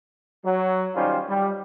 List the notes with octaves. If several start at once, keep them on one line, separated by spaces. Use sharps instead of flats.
F#3
D#3 G3 C#4 F4 C5
G3